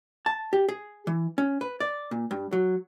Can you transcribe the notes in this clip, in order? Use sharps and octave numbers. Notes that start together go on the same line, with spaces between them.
A5
G4
G#4
E3
C#4
B4
D5
A#2
G2
F#3